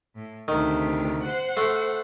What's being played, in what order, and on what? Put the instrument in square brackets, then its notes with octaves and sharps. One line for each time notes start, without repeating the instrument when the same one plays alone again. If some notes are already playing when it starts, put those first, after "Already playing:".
[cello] A2
[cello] D2 C3 [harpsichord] D#3
[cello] C5 F#5
[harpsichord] A3 C6